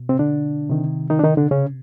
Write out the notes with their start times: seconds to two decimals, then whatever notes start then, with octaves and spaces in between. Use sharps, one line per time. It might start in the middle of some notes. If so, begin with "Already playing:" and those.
Already playing: B2
0.09 C3 C4
0.19 D3 D4
0.69 C3 D#3
1.10 D#3 D#4
1.19 D4
1.24 D#3 D#4
1.37 D3 D4
1.51 C#3 C#4